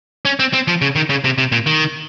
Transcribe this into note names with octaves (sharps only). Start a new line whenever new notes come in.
C#4
C4
C4
F3
C#3
D#3
C#3
C3
C3
A#2
D#3